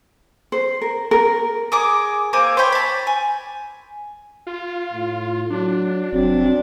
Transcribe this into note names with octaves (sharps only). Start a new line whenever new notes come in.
C5
A#4
A#4
G#4 A#4 D6
A#3 C4 G#5 D6
C5 C#5 G5 B5
A5 B5
G#5
F4
A2
F#3 D4
F1 F#3 C4 D4